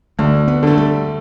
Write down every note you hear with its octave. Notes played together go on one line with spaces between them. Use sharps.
D2 A3
B3
D3 A3
G3